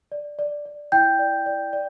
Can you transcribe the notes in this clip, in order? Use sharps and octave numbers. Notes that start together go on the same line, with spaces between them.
D5
D5
D5
E4 G5 G6
D5
D5
D5